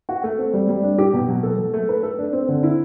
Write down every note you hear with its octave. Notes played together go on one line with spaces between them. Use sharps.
F#4
A3
C4
G3
G3
D4
G4
B2
F#3
A4
F#3
A3
B4
A4
D4
C4
D3
E4